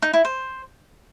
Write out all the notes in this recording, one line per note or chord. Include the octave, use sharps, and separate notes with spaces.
D#4
E4
C5